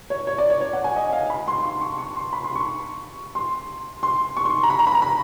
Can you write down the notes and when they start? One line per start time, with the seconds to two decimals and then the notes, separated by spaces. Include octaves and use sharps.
0.10 C#5
0.27 C#5
0.38 D5
0.50 C#5
0.61 C#5
0.73 F#5
0.84 G#5
0.96 D#5
1.13 F5
1.30 B5
1.48 C6
1.65 C6
1.81 C#6
1.98 C#6
2.16 C6
2.33 B5
2.44 C6
2.56 C#6
3.35 C6
4.03 C6
4.37 C#6
4.45 C6
4.63 A#5
4.70 B5
4.79 A#5
4.87 B5
4.95 A#5
5.02 B5